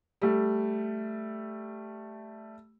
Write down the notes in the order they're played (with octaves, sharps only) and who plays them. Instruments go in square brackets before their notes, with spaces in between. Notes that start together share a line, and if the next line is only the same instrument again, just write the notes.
[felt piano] G3 A3